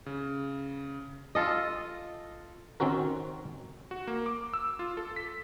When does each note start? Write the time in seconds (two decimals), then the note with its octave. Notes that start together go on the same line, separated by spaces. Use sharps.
0.06 C#3
1.35 F4 A4 D#5
2.80 D#3 C4 C#4 F#4 A#4
3.91 F#4
4.07 A#3
4.26 D6
4.53 E6
4.79 F4
4.97 A4
5.16 B6